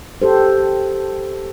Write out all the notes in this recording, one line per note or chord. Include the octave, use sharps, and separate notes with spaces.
G4 A4 C5